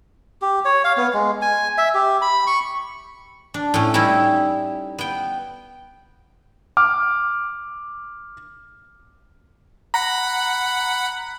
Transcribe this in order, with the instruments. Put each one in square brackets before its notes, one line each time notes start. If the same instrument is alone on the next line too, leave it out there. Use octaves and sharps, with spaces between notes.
[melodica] G4
C#5
F5
B3
G#3
G#5
E5
G4
B5
C#6
[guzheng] D4
A2 C#4
G3 C#4 D#4 E4
B3 G5
[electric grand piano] D6 F6
[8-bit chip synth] F#5 B5 [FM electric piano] A#5